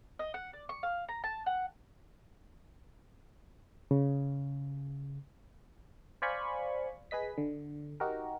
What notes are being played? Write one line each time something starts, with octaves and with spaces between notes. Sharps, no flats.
D#5
F#5
D5
C#6
F5
A#5
A5
F#5
C#3
C5 D5 F5 G#5 B5 C#6
G#4 B4 D#5 B6
D3
D#4 F#4 G4 A#4